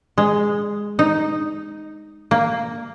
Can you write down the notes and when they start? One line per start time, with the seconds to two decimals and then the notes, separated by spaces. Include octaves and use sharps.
0.18 G#3
0.99 D#4
2.31 A#3